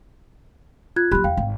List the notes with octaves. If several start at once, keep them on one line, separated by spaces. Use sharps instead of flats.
F4 F#6 G#6
F#3 A#3 G4 B5 F#6
E2 F5 G5
G#1